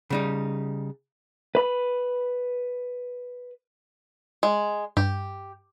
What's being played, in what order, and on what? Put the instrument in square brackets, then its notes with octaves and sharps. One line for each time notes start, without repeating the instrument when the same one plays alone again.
[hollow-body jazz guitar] C#3 G3 D#4
[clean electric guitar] B4 B5
[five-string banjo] G#3
[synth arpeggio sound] G2 [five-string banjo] G4